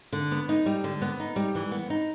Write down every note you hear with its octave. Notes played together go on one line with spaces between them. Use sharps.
D3
B3
D#4
G3
D3
B3
D#4
G3
E3
B3
D#4